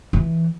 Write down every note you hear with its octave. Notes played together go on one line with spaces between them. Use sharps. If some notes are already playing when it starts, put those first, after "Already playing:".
E3